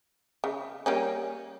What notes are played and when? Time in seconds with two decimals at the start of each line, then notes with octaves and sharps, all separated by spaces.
0.44 C#3
0.86 G3 A#3 C#4